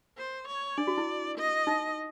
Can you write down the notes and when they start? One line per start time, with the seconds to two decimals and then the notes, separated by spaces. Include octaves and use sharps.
0.18 C5
0.48 C#5
0.77 D4 D5
0.87 F#4
0.98 E4
1.38 D#5
1.67 D#4